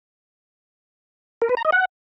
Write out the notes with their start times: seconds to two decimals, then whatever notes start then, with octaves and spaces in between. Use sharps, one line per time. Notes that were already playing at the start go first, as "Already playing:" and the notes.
1.42 A#4
1.49 B4
1.57 A#5
1.65 D#5
1.72 F#5